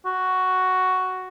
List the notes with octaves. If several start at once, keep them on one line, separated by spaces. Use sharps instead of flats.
F#4